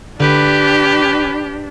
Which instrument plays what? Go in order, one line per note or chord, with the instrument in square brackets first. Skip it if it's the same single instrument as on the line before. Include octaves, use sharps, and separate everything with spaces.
[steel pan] D3 [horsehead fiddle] D4 [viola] G4 [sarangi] B4